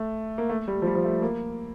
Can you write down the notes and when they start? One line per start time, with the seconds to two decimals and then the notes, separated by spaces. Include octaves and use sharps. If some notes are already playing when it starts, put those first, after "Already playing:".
Already playing: A3
0.38 A#3
0.49 A3
0.68 G3
0.82 F3
0.87 G3
0.95 F3
1.04 A3
1.22 A#3